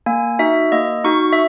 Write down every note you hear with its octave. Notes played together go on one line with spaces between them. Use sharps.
A#3 G#5
D#4 F#4 E5
A#3 D#5
D#4 F#4 C#6
E5